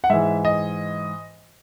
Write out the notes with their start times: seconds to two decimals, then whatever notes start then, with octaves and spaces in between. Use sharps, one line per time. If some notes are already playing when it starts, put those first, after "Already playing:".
0.04 F#5
0.10 G#2 E3 E5
0.45 D#5